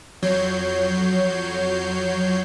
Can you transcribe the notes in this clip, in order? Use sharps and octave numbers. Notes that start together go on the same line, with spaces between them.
F2 F#3 C#5 G6 C7